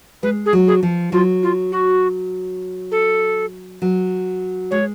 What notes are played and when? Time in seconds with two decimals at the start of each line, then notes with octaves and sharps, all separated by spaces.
0.23 G#3 B4
0.46 G#4
0.53 F#3
0.67 G#4
0.83 F3
1.12 F#3 F4
1.43 F4
1.72 F#4
2.91 A4
3.82 F#3
4.71 G#3 C#5